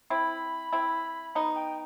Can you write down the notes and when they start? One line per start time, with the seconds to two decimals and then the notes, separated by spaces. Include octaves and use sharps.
0.10 C4 E4 B5
0.73 C4 E4
1.35 B3 D#4
1.55 G5